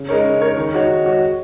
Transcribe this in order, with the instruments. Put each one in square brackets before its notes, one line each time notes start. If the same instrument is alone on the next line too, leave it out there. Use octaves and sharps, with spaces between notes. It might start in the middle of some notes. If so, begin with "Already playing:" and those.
Already playing: [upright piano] C#3
G#3 D#4 A#4 C#5
C#3
G#3 D#4 A#4 C#5
D#3
G#3 D#4 F#4 C#5
D#3
G#3 D#4 F#4 C#5